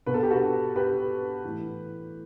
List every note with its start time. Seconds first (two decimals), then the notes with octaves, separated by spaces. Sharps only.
0.06 B2 B4
0.14 A4
0.23 G4
0.30 F#4 A4
0.76 G4 B4
1.44 A2 E3